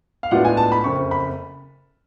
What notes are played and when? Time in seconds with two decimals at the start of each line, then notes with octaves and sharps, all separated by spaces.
0.23 F5
0.31 A2 G#3 B3 D4 F4 F#5
0.45 G#5
0.57 A5
0.72 B5
0.84 F#1 F2 C#3 C#6
1.11 B5